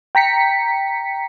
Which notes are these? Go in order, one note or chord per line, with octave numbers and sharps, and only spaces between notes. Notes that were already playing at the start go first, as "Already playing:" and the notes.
G5 A#5 B6 C#7